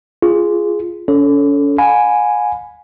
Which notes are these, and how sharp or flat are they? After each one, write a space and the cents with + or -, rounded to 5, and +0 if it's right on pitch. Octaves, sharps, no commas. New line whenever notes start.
F4 -15 G#4 +0
C#4 +40 A4 +0 C#5 +0
F5 +45 G#5 +0 B5 +0